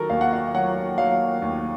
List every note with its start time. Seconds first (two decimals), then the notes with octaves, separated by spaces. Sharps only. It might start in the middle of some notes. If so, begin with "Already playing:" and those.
Already playing: D#3 F#3 F#4 A4 A#4
0.10 D#2 F5
0.21 F#5
0.33 F5
0.54 F#3 F#5
0.98 F#3 F5
1.42 D#2